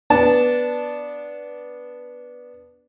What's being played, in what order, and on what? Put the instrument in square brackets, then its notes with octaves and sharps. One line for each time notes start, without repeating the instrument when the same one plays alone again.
[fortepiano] B3 D4 A5